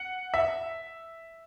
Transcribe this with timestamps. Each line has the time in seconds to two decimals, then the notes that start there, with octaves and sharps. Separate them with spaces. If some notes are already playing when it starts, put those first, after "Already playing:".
Already playing: F#5
0.34 E5